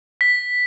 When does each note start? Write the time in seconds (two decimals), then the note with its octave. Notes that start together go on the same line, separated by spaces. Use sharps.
0.21 B6